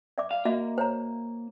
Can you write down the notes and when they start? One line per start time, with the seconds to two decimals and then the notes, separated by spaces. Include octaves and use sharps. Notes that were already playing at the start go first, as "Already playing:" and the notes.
0.18 D5 E5 D6
0.31 F5
0.45 A#3 F#4 D#5 E5
0.78 C5 C#5 A#5